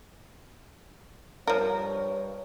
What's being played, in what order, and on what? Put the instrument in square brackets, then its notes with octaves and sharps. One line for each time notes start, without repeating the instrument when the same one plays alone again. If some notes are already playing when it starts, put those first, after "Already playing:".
[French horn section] G2 C#5 [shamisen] F3 A#4